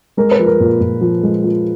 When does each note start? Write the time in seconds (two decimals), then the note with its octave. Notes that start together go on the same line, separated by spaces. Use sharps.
0.17 G#3 A#4
0.31 B4
0.39 F3
0.46 A#4
0.60 A#2
0.81 A#2
1.01 F3
1.23 G#3
1.44 F3